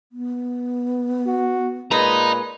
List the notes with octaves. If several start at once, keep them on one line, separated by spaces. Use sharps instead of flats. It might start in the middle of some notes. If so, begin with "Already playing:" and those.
B3
F#4
A#2 G#3 B4 D#5 A#5